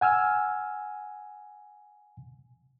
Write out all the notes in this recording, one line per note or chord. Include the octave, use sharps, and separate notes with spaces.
F#5 G#5 E6 F6